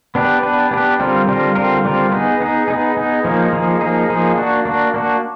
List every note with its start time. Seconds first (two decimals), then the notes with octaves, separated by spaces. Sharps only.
0.15 B3 D4 G4 B4
0.43 B3 D4 G4 B4
0.71 B3 D4 G4 B4
0.99 D3 G3 C4 F4 A#4
1.28 D3 G3 C4 F4 A#4
1.55 D3 G3 C4 F4 A#4
1.84 D3 G3 C4 F4 A#4
2.12 B3 D#4 G#4
2.40 B3 D#4 G#4
2.68 B3 D#4 G#4
2.97 B3 D#4 G#4
3.25 F3 A#3 D#4 G#4
3.53 F3 A#3 D#4 G#4
3.81 F3 A#3 D#4 G#4
4.09 F3 A#3 D#4 G#4
4.37 A#3 D4 F#4
4.65 A#3 D4 F#4
4.94 A#3 D4 F#4